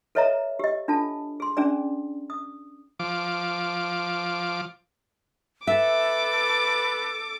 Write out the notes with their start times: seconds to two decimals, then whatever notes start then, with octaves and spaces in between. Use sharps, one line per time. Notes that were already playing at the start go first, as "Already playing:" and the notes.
0.15 A4 B4 C#5 D#5 E5 A#5
0.59 G4 D#5
0.88 D4 F4 A4 A5
1.40 G#4 C6
1.57 C#4 D4 G#4 D5
2.30 D#6
2.99 F3 D6
5.67 A4 B4 E5 D6